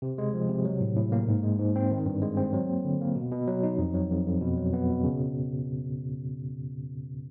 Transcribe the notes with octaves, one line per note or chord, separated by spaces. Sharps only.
C3
G#3
F3
C3
F#3
A2
A2
A#3
G#2
G#3
G#2
C4
D#3
G2
G#3
C4
F#3
A#3
D3
A#3
B2
B2
F#3
D#4
F2
F#3
F2
F2
B2
F#3
B3
B2
C#3